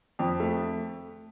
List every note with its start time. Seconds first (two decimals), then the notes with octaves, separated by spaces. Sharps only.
0.19 F2
0.40 A3